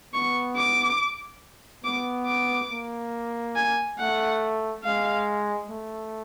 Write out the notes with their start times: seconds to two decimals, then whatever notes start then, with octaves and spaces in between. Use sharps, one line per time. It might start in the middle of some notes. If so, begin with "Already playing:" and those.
0.13 B3 C#6
0.57 D6
1.84 B3 D6
2.27 D6
2.71 A#3
3.56 G#5
3.99 A3 F#5
4.84 G#3 F5
5.70 A3